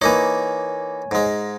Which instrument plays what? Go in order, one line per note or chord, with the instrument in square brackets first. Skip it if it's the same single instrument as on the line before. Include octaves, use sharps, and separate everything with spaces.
[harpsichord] E3 A#3 D#4 [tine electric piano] C#5 G#5
[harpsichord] G#2 G#3